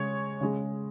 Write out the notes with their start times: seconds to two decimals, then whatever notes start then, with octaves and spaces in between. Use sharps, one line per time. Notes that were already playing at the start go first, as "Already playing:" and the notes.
Already playing: C#3 G#3 C#5
0.41 C#3 G#3